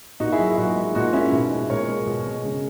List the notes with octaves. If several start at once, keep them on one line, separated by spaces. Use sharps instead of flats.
A#2 D#4 F#4
E4 G#4
F#3
A#2 D#4 F#4
G#3
A#2 D#4 F#4
G#3 C#4 E4
B2
G#3
A#2 A#4 C#5
G#3
B2
G#3
C#3